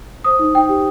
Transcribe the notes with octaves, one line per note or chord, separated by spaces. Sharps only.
C5 D#6
D#4
D#4 G5
G4